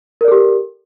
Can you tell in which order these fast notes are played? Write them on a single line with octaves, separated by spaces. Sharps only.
A#4 D5 A4 G4